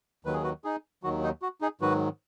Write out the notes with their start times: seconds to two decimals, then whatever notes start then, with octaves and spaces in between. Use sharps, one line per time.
0.25 D#2 D#3 F#3 B4
0.34 G#4
0.43 F#4 B4
0.64 D#4 G#4
1.03 D#2 D#3 F#3 F#4
1.23 D#4
1.42 F#4
1.61 D#4 G#4
1.81 G#2 D#3 F#3 F#4 B4